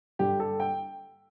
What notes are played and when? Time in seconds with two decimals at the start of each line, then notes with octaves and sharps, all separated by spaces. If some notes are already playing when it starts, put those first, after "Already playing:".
0.19 G2 D3 G4
0.40 A4
0.60 G5